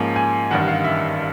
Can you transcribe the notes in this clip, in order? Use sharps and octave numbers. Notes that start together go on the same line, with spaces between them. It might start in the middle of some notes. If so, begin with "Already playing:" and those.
Already playing: G#2 F3 A#3 C#4
G#5
A1 G2 D#3 F#5
F5
E5